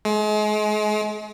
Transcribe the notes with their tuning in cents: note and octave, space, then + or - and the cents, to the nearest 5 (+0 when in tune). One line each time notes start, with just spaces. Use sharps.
G#3 +35